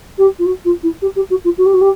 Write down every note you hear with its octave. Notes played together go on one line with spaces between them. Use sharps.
G4
F4
F#4
F4
E4
G4
G4
F#4
F4
F#4
G4
F#4
G4